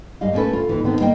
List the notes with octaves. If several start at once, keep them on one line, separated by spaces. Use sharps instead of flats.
F#2 G3 D#5 F5
A3 A#3 C#4 D4 A4 B4
D2 F4
D#2 E3
D3 D#3 A3 B3 C4
G3 A#3 D#5 G5